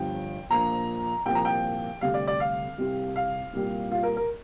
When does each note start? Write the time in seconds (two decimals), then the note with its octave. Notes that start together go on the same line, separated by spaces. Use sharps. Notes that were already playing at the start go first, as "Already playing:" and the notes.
Already playing: G1 G2 F3 G5
0.50 A#1 A#2 F3 A#5
1.26 C2 A#2 F3 G5
1.35 A#5
1.45 G5
2.01 D2 C3 G3 F5
2.14 D5
2.27 D5
2.40 F5
2.78 C2 C3 G3
3.16 F5
3.53 C2 A#2 G3
3.91 F4
4.03 A#4
4.17 A#4